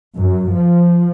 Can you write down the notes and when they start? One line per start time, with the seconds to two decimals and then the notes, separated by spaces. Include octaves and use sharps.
0.17 F#2
0.52 F3